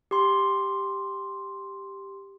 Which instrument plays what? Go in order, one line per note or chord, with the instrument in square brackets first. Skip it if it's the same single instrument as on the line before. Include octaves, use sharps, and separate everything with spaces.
[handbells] G4 C6